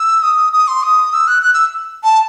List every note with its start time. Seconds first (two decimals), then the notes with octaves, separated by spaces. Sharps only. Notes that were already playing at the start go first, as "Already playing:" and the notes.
Already playing: E6
0.22 D#6
0.53 D#6
0.68 C6
0.83 D#6
1.14 E6
1.28 F#6
1.43 F#6
1.54 E6
2.03 A5